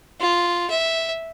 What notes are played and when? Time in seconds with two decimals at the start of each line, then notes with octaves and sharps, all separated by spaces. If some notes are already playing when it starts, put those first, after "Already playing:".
0.20 F4
0.70 E5